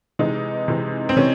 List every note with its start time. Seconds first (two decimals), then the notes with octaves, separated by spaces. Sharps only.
0.19 C3 E3 G#3 D#4
0.68 C3 E3 G#3
1.09 C4
1.16 C3 E3 C#4